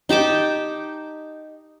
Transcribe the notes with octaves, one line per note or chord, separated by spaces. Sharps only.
D#4 G4 A5 D6